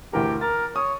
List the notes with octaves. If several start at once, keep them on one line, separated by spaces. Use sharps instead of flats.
D2 E3 G4 A#4
A#4 A6
C#5 D#6